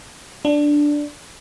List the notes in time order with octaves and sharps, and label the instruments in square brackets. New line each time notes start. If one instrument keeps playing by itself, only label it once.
[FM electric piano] D4